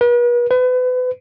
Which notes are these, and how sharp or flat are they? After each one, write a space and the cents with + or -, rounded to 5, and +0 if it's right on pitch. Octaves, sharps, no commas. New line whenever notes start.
B4 -40
B4 +35